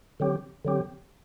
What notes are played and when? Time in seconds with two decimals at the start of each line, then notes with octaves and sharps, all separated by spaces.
0.20 D3 F#3 C4 G4
0.65 D3 F#3 C4 G4